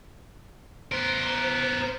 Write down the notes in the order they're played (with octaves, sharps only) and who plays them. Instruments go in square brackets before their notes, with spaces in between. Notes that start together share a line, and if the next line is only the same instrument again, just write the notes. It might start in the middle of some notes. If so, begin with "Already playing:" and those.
[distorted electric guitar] B3 A#4 [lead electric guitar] C5